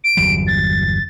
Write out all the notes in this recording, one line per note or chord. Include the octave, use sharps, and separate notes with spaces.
D7
G1 E2 F#3
A6